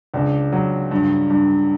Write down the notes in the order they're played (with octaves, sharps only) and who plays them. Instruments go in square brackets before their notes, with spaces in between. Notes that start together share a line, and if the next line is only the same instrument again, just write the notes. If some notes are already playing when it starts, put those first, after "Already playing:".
[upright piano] C#2 D4
F#3
G2
G2